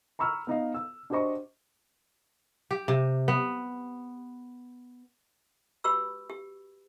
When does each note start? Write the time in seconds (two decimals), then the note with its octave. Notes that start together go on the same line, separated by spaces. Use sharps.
0.19 A#5 B5 C#6 E6 F6
0.47 B3 D#4 D#5 F5
0.74 E6
1.10 D4 F#4 G4 C5 D#5 C#6
2.71 G4
2.88 C3
3.28 B3
5.84 F#4 G4 B4 B5 C#6 E6
6.30 G4